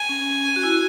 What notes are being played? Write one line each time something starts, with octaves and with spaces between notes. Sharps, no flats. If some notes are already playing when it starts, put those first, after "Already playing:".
Already playing: G#5
C#4
F#4
E4
F#4